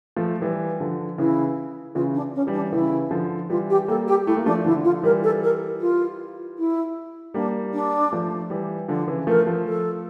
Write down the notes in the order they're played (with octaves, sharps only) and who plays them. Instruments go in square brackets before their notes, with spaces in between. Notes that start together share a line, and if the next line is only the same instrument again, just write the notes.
[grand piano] F3 A3
E3 G3
D3 F3
[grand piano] C#3 E3 [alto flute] E4
[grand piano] C#3 E3 [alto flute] F4
[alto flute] D4
C#4
[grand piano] E3 G3
[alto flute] D4
[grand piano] C#3 E3 [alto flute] E4
[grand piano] D3 F3
[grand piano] E3 G3 [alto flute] F4
[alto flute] G4
[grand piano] G3 A#3 [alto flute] A4
[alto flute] G4
[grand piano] A3 [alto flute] E4
[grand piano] A#3
[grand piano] F3 A3 [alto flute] D4
[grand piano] D3 F3 [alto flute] E4
[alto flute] F4
[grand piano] E3 G3 [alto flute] A#4
[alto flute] A4
A#4
F4
E4
[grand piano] G3 A#3 [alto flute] D4
[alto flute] D4
[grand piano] F3 A3
E3 G3
[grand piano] D3 F3 [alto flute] D4
[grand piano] C#3 E3
[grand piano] F3 A3 [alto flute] A#4
[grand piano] F3 A3
[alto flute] A4